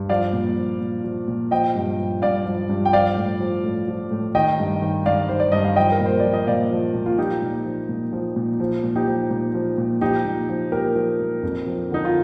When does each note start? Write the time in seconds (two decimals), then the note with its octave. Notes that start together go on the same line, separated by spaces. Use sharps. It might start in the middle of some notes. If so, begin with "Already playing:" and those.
Already playing: G2
0.09 F3 D5 F5
0.33 A#2
0.57 F3
0.80 A#2
1.04 F3
1.28 A#2
1.51 F3 D#5 G5
1.75 G2
1.99 F3
2.22 G2 D5 F5
2.46 F3
2.69 G2
2.85 G5
2.93 F3 D5 F5
3.17 A2
3.40 F3
3.64 A2
3.88 F3
4.11 A2
4.35 D#3 D#5 G5
4.59 G2
4.82 D#3
5.06 G2 D5 F5
5.29 D#3 C5
5.40 D5
5.52 G2 D#5
5.65 F5
5.76 F3 D#5 G5
5.92 A#4
6.00 A#2
6.06 C5
6.20 F3 D5
6.33 D#5
6.47 A#2 D5 F5
6.71 F3
6.94 A#2
7.06 F4
7.18 F3 D#4 G4
7.42 A#2
7.65 F3
7.89 A#2
8.13 F3
8.36 A#2
8.60 F3
8.83 A#2
8.95 D#4 G4
9.06 F3
9.31 A#2
9.54 F3
9.78 A#2
10.01 F3 D#4 G4
10.25 A#2
10.49 F3
10.72 A#2 G4 A#4
10.96 F3
11.20 A#2
11.43 F2
11.67 F3
11.91 D3 D#4
12.05 F4